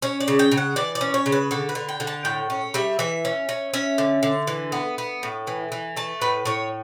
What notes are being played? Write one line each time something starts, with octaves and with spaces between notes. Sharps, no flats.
C#4 C#5
D5
C#3
G5
C#3
F#5
E3 D5
D5
C#4
C#5
C#3
B4
D3 A4
B4
D3
G5
D3
A5
A2 G5
C#4
G3 E5
E3 E5
C#4
C#4
C#4 E5
D3
D3
E3
B3
B3
A2
E3
E3
A3 A5
A2 B4
A2 C#5